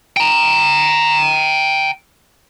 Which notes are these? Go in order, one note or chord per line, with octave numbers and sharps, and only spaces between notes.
G5 A#5